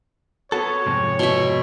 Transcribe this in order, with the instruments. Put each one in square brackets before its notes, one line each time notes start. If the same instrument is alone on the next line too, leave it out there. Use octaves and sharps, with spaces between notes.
[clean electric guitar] B3 F#4 A4 [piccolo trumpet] C#5
[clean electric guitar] F2 G#2 C3
[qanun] B2 E5